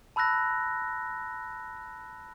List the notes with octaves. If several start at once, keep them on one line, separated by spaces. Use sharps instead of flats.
A5 B5 E6 F#6 A#6